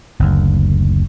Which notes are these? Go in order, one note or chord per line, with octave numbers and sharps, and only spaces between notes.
F#1 D2